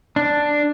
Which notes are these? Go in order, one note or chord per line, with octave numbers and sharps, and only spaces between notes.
D4